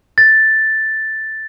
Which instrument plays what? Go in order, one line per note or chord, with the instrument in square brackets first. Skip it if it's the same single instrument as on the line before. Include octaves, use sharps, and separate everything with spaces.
[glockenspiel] A6